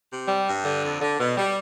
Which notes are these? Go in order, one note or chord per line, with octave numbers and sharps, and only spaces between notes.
C3
G3
G2
D3
F2
D3
B2
G3